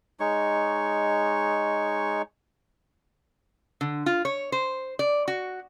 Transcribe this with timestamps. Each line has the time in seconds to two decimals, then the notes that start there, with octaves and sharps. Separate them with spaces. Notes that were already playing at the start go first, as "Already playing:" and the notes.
0.20 G#3 D#4 C#5 C#6
3.81 D3
4.06 F4
4.25 C#5
4.52 C5
4.99 D5
5.28 F#4